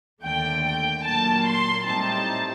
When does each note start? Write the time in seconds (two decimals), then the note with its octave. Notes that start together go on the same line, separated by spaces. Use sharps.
0.23 D#2 D3 A3 G5
0.63 G5
1.04 A#2 F#3 A#3 A5
1.45 C6
1.86 A2 G3 C4 D#4 A5